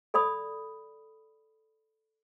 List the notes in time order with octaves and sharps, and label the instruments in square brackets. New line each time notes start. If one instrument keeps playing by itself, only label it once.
[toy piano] A4 D5 B5 D#6